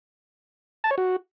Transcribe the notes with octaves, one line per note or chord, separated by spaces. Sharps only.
A5
C#5
F#4